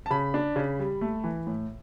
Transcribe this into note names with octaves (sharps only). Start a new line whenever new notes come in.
A5
C#3 B5
D4
C#3
G3
A3
E3
A2